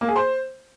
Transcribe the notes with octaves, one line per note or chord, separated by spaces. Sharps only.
A#3
G#4
C5